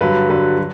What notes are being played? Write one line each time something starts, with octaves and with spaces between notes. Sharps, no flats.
G2 D3 F#3 B4
G2 D3 F#3 B4
F#3